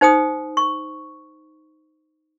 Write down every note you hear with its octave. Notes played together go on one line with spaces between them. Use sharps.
D#4 C5 G5 D#6
C#6